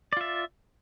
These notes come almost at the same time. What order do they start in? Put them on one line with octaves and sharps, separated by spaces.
D5 F4 E5